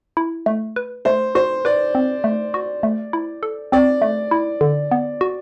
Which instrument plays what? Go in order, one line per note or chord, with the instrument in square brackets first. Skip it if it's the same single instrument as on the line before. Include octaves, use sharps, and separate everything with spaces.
[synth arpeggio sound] E4
A3
B4
[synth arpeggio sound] A3 [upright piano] C5
[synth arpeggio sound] F#4 [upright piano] C5
[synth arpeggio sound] B4 [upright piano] D5
[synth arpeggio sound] C4
A3
F#4
A3
E4
A4
[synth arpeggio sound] C4 [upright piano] D5
[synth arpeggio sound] A3
E4
D3
B3
F#4